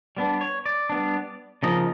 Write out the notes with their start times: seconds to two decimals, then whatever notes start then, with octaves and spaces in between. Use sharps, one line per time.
0.17 G3 B3 D4
0.41 C#5
0.66 D5
0.89 G3 B3 D4
1.63 C#3 F3 A#3 D#4 D#5